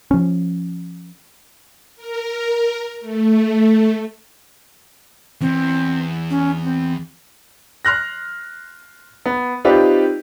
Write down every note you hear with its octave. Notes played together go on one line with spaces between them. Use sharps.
F3 C#4
A#4
A3
E2 C4
C#4
C4
C6 F6 F#6 A#6
B3
C4 D#4 F4 G4 B4 D5